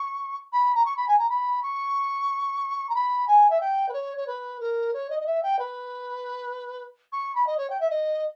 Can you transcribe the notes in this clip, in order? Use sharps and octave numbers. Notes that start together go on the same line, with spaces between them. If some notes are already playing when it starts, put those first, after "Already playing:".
Already playing: C#6
B5
A#5
C#6
B5
G#5
A#5
B5
C#6
A#5
B5
G#5
E5
G5
B4
C#5
C#5
B4
A#4
C#5
D#5
D#5
E5
G5
B4
C#6
B5
D#5
C#5
G5
E5
D#5